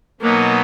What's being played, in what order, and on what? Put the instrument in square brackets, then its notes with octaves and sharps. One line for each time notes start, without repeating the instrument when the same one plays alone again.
[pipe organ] B2 F#3 B3 D#4 [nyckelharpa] A#3